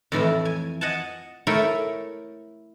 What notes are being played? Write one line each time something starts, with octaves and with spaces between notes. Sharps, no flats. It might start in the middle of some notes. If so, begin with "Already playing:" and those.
F2 A2 E3 E4
G#5
D#5 F#5 G#5 A5
A3 E4 A#4 C#5 G5 G#5